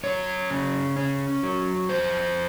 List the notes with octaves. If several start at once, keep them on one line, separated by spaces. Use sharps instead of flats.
F#2 C#5
C#3
C#4
F#3
F2 C5